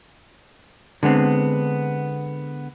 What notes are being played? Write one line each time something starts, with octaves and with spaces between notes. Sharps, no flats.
D3 G#3 B3 C4